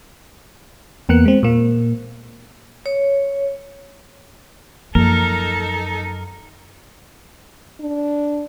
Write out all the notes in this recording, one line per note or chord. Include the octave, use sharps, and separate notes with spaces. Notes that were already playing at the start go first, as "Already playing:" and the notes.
E2 A#3 B3 F#6 C#7
G#3 C4
A#2 A#3
C#5
F#2 F3 A#3 D#4 A4 A#4
D4